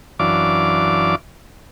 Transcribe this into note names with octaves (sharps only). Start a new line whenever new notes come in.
F#2 E3 D4 D5 F5 D6